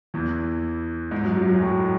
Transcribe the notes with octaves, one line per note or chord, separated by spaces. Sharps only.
E2 E3
G#2 G#3
F#2 F#3
F#2 F#3
F#2 F#3
A2